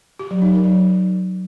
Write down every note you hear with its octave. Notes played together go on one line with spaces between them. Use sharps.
G4
F#3
D#4
A#4
F#3